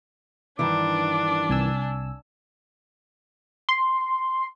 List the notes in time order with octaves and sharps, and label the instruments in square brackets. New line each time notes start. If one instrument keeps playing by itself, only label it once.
[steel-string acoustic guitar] G2 D#3 E3 [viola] D4 [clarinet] D6
[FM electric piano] C2 G#5 E6
[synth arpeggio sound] C6